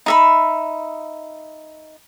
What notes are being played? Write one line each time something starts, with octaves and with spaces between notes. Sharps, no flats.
D#4 E5 B5